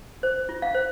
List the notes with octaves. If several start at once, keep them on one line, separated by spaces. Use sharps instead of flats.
C5
F4
F5
C5